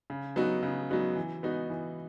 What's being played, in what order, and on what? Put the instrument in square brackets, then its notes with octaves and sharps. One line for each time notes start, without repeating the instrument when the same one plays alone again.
[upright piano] C#3
F#3 B3 D#4 F#4
C#3
F#3 B3 D#4 F#4
E3
B3 D#4 F#4
E3